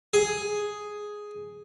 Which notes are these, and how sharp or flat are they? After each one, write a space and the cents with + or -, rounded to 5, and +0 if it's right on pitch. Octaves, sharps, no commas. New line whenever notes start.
G#4 +5